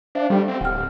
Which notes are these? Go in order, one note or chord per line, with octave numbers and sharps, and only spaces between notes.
D4 C5 E5 F5
G3 G4 A4 G5
C4
D1 F#5 G5 F6